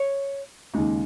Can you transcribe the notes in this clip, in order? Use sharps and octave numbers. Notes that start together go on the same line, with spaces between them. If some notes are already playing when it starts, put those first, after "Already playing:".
Already playing: C#5
D#2 C#3 G#3 D#4